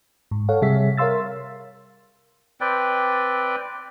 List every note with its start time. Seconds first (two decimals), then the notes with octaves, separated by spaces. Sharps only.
0.31 G#2
0.48 A4 C#5 F5 F#5
0.62 C3 G3 G#4 E5 B6
0.97 A#4 C#5 F5 C6 E6 A6
2.61 C4 B4 D5 G5